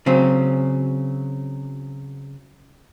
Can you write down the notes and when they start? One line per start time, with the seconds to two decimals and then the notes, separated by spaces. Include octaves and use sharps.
0.06 C#3 F#3 C4